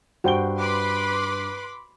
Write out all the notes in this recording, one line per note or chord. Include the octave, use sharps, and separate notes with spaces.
G2 F#4 C5 G5 G7
B4 B5 C6 D6